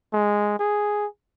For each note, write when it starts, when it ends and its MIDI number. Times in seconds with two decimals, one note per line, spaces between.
0.13 0.57 56
0.59 1.06 68